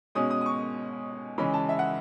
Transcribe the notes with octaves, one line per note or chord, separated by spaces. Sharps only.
B2 G#3 C#4 D#6
D#6
D#6
C#6
C#3 E3 G#3 C#4 B5
A5
E5
F#5